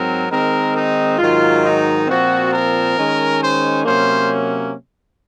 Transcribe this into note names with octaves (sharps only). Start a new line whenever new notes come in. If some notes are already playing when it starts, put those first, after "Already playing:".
Already playing: G#2 F#3 C4 A#4
D#3 G#3 C4 A#4
D#4
G#2 D#3 F#3 F4
D#4
A#2 F3 C4 F#4
A#4
D#3 G#3 C#4
C5
C3 F#3 A#3 C#4 C5